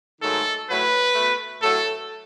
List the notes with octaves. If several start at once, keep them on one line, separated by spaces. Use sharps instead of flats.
G#2 D#3 F#3 A3 A4
A2 F#3 A3 B4
B2 A3
A2 F#3 A3 A4